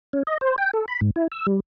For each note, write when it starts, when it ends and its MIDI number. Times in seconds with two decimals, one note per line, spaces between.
0.13 0.23 61
0.27 0.38 75
0.41 0.56 72
0.58 0.71 79
0.73 0.85 69
0.88 1.00 83
1.01 1.11 44
1.16 1.27 64
1.32 1.47 88
1.47 1.60 55